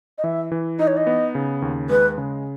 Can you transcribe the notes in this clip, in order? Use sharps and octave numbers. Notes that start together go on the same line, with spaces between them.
D#5
E3 E5
E3
D#4 D#5
C#5
D#5
B3
C#3
D#2
G#3 B4
C#3